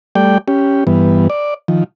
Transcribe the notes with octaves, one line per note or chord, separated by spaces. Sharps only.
G3 A3 D5 G5
C#4 G4
G2 E3 B3
D5
D#3 F3